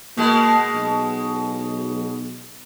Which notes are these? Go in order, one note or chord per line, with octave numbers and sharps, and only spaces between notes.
B2 G#3 A#3
B1